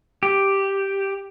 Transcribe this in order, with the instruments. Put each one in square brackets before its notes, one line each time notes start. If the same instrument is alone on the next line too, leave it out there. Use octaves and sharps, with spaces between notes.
[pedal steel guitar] G4